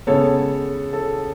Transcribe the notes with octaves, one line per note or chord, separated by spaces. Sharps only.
C#3 G#3 B3 A4 C#5
A4